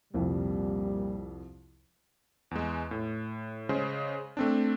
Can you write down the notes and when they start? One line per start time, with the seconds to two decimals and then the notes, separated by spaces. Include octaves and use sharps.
0.14 C2 F2 A#2 G3
2.51 E2 G#3
2.91 A2
3.69 C#3 G#3 C5
4.37 A3 C4 D4